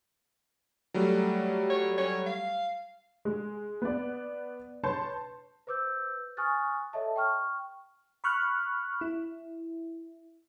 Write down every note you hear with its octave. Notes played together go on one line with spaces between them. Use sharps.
F#3 G3 A3
C#5
C#5
F5
G#3
B3 D5
B4 C#5 A5 C6 G6
B4 C5 D6 E6 G6
G#5 C#6 D#6 F6 F#6 A6
A4 C#5 D#5 E5 A5
G5 C#6 F6
B5 C#6 F6 F#6
E4